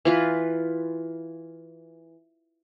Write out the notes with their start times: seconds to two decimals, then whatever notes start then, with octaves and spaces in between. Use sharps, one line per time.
0.05 E3 F4 B4